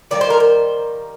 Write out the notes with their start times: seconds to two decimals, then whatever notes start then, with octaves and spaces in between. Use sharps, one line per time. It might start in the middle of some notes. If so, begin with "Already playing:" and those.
0.11 D#3 G3 A#3 D5
0.21 C5
0.30 A#4
0.40 C5